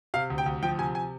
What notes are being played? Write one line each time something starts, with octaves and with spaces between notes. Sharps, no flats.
C3 F5
D2
G5
D2
F3 G5
C3 G#5
G#5